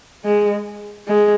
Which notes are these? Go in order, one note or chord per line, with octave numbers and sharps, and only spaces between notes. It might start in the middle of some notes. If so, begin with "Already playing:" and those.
G#3
G#3